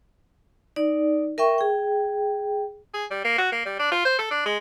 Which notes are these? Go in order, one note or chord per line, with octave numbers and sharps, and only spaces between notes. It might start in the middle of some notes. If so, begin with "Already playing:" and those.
D#4 D5
A#4 E5 G5 C#6
G#4 G5
G#4
G3
A#3
F#4
A#3
G3
D4
F4
C5
A4
D4
G#3